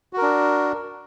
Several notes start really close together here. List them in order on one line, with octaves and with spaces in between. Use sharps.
F#4 A#4 D4